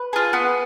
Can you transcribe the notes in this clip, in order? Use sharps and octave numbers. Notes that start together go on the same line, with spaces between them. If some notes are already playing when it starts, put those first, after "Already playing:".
Already playing: B4
F4 G#4
B3